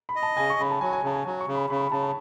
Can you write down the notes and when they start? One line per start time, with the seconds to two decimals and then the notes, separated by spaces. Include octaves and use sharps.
0.09 B5
0.16 D#5
0.23 A5
0.37 C#3 G#5
0.50 C#6
0.59 C#3 B5
0.71 A5
0.81 F#3 G#5
0.93 G#5
1.03 C#3 A5
1.15 G#5
1.25 F#3 G#5
1.41 C#6
1.47 C#3
1.55 B5
1.70 C#3 B5
1.81 B5
1.91 C#3 A5
2.03 A5